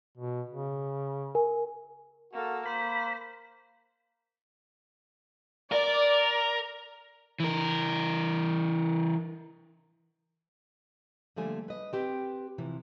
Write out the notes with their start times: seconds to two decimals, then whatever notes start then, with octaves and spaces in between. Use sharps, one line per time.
0.18 B2
0.49 C#3
1.35 A#4 G#5
2.33 A#3 F#4 A4
2.66 A#3 C5 B5
5.72 A#4 D5
7.40 E3 A#4
11.36 D3 F3 G3 A3 A#3 G#5
11.68 B4 D#5
11.93 C4 G4 B4
12.58 C3 E3 F3